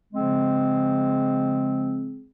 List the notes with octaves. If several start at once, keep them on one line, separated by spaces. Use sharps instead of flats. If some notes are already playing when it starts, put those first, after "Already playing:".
C#3 F3 G#3 C4 G#4